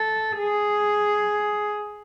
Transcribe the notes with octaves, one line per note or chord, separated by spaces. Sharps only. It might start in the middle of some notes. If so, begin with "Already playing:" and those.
Already playing: A4
G#4